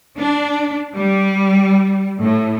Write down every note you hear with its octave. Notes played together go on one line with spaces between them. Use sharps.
D4
G3
A2